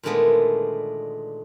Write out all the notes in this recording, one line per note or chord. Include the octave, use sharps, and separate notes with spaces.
A#2 D3 D#3 G#3 A3 B3